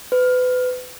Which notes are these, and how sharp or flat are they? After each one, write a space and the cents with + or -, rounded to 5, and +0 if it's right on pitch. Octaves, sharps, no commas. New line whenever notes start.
B4 +30